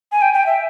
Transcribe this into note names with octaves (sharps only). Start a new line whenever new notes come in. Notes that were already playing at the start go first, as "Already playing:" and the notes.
G#5
G5
G5
E5